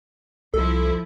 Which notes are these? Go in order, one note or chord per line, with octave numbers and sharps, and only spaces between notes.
C2 F3 E4 A4